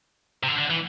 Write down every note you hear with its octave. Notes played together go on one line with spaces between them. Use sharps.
C3
D3
D3
E3